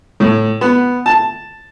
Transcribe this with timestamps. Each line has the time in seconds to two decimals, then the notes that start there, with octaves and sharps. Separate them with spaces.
0.20 A2
0.61 B3
1.06 A5